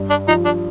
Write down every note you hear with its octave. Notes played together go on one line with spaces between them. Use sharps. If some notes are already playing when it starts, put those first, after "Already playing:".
Already playing: G2
D4
F3 D#4
D4